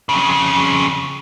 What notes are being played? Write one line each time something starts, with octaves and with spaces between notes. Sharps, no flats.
F2 C#3